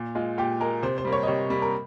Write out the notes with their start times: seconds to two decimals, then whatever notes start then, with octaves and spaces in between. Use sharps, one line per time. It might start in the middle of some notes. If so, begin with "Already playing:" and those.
Already playing: A#2
0.15 G#3 F4
0.38 A#2 G4
0.60 G#3 A#4
0.82 C3 C5
0.98 C5
1.05 G3 A#3
1.13 C#5
1.23 D#5
1.27 C3 C#5
1.50 G3 A#3
1.62 A#4